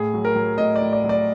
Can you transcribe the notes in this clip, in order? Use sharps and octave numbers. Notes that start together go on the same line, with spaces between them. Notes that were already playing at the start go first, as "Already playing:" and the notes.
Already playing: A2 G#4
F#3
A#4
F#3
A2 D#5
D5
A2
D5
F#3
D5